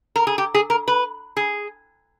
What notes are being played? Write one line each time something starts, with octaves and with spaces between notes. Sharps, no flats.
A#4
G#4
G4
G#4
A#4
B4
G#4